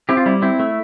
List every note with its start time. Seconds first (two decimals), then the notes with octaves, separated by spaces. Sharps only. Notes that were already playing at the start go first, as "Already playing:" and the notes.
0.09 C4 E4 G4
0.17 F4
0.26 G3 E4
0.42 C4 E4
0.59 A3